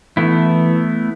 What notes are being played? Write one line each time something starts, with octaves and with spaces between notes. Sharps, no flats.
E3 A3 B3 E4